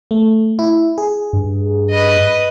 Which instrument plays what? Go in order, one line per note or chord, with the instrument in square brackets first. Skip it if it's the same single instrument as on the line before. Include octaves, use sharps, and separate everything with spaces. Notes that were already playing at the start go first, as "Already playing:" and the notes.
[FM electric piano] A3
E4
G#4
[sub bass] G2
[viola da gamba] B4 D#5